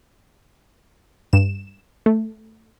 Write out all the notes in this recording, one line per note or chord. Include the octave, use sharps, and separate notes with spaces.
G2 E7
A3